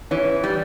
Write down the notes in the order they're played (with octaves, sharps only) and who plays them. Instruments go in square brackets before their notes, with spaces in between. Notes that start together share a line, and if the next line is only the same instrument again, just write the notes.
[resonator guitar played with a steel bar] E3 [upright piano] C#4
[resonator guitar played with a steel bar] G3